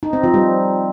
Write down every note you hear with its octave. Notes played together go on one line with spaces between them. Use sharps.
D#4
C4
F3
G3